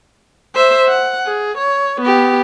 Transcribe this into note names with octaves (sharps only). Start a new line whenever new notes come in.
C5 E5
F#5
G#4
C#5
B3 G4